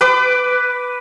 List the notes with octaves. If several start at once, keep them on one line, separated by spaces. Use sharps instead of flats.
B4 D6